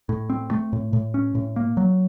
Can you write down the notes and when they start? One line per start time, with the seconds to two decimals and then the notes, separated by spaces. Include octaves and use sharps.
0.09 A2
0.30 C4
0.51 A3
0.73 A2
0.93 A2
1.14 C#4
1.35 A2
1.56 A#3
1.77 F#3